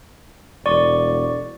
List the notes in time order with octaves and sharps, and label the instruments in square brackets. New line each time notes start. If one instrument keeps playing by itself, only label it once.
[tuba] E1 [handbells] D5 C#6